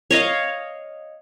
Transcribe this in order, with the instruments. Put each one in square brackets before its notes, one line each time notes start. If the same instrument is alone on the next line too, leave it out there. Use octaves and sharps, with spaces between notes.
[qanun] C#5 D#5 F5